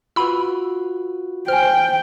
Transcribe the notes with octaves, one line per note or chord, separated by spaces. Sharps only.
F4 F#4 B4 B5 E6
C5 G5 G#5 F6